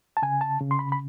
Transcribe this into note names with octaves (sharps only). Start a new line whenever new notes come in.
A5
C#3 G#5
A5
C#3
C6
B5
B5